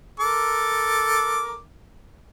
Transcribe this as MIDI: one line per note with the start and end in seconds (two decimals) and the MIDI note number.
0.20 1.58 69
0.20 1.58 70
0.20 1.58 86